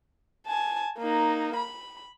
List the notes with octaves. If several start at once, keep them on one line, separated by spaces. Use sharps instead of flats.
G#5 A5
A#3 D#4
B5